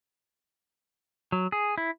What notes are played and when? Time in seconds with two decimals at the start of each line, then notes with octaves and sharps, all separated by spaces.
1.32 F#3
1.52 G#4
1.78 E4